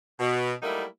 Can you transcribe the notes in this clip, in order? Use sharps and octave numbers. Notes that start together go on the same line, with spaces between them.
B2
F#3 G3 A3 A#3 D#4 E4